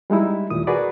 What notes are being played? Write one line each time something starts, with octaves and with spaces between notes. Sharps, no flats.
G3 G#3 D#4 E4
D#2 A#2 D#6
F#4 G#4 A#4 B4 D5